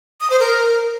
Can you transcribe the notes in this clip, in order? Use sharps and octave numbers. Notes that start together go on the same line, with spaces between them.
D#6
C5
A#4